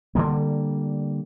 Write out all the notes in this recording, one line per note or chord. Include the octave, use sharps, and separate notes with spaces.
D3 G3 A#3